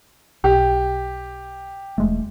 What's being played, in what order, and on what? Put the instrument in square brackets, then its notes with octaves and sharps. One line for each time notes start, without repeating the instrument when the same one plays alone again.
[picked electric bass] B1 [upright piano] G4
[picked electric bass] E1 G#3 A3